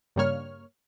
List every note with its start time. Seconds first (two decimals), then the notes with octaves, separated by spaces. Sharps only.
0.16 G2 C#3 G3 A#3 C#5 F6